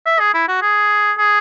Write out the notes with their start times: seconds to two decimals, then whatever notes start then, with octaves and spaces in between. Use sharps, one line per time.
0.06 E5
0.20 G#4
0.34 E4
0.48 F#4
0.62 G#4
1.18 G#4